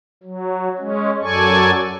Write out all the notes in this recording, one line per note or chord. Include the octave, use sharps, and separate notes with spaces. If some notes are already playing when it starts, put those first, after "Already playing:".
F#3
G#3 C#4
F#2 F#3 A4 D5 G#5 C#6